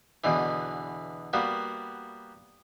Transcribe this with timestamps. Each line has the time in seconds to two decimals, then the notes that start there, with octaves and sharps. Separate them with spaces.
0.24 E2 B2 D3 E3
1.33 G3 A#3 B3 F#4